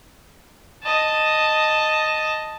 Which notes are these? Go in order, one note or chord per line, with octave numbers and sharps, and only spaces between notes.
D#5 A5